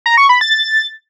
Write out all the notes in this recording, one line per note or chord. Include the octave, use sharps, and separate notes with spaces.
A#5
C#6
B5
A6